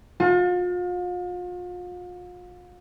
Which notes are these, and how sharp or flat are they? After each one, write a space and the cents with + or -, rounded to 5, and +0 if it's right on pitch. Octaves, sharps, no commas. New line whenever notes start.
F4 +40